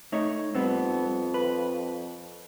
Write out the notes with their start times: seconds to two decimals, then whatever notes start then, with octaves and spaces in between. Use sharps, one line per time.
0.12 A3 D#4 C#5
0.55 F2 G3 B3 C4
1.34 B4